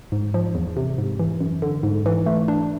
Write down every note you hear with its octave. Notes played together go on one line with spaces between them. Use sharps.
G#2
F3
E2
C3
G#2
E3
F#2
D3
G#2
E3
A3
D4